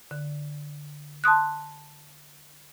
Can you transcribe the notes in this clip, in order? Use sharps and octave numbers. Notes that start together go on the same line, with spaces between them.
D3
A5 C6 D#6 F#6